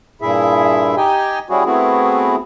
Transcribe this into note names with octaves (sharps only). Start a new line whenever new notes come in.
G2 A#2 E4 G#4 E5
D#4 G4 D#5 G5 G#5
G3 C#4 E4 F#4 G#4
A3 B3 C4 E4 F#4 G#4